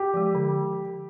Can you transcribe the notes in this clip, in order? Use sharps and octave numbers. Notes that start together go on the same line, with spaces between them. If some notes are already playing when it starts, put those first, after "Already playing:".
Already playing: G4
F3 G#3
D3